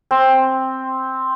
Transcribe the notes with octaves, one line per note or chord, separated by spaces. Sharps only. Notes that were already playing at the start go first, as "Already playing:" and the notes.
C4